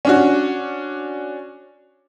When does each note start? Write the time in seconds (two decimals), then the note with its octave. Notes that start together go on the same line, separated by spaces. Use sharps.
0.05 C#4 D4 F#4